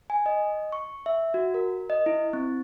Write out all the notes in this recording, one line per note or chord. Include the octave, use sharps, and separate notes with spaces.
G#5
D#5
C#6
E5
F#4
A#4
D#5
E4
C4